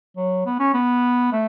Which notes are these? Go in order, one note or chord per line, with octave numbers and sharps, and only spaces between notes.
F#3
B3
C#4
B3
A3